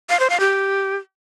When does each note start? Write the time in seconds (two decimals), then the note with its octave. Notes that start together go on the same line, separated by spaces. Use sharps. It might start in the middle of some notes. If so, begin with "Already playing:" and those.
0.10 F5
0.20 C5
0.30 F5
0.40 G4